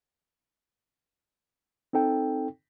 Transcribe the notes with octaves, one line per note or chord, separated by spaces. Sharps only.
C4 D#4 A4 G5